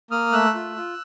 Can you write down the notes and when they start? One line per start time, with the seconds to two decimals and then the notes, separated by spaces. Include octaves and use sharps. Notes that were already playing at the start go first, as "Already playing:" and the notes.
0.11 A#3 D#6 F6
0.33 A3 E6 F#6
0.55 F4
0.76 F4